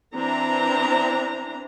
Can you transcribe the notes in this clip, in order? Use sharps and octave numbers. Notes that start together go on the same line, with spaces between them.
E3 C4 D4 A#5